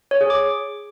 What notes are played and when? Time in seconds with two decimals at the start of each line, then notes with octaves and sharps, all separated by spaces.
0.11 C#5
0.21 G#4
0.30 D6